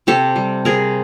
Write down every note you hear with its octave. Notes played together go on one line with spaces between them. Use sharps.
C3 G4 A4
G3
C3 G#4 A#4